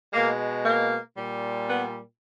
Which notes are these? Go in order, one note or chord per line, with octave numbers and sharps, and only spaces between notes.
B2 G#3 A#3
A#3
A#2 G3
B3